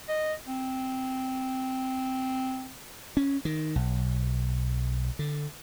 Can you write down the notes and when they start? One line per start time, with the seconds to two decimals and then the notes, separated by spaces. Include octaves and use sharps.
0.09 D#5
0.47 C4
3.17 C#4
3.45 D#3
3.76 B1
5.19 D3